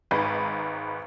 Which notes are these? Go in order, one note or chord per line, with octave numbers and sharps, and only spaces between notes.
G#1 G#2 B4